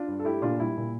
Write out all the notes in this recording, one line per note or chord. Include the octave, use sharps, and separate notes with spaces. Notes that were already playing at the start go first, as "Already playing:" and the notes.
Already playing: D4 F4
G2
A4
A3 E4 G4
A#2 D4 F4
G3 E4
A#2